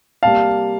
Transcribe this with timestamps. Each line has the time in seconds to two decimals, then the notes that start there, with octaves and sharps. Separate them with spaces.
0.23 C3 G3 A#3 F5 A5